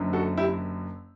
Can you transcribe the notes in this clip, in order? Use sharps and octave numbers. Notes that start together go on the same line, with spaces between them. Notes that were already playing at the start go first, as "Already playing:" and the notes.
Already playing: F#1 F#2 D3
F#4 A4
E4 G4